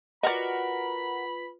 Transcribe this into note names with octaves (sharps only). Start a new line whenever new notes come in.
F4 F#4 A#4 B4 D5 D#5 B5